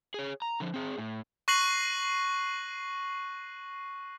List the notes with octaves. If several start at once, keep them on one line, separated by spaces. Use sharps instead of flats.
G#4 C#5
A#5
D3 F3
C4 G#4
A2
C#6 F#6 A#6 C7 D#7 F#7